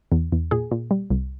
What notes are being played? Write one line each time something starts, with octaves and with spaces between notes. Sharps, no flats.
E2
E2
A#2 G#4
A#2
G3
C2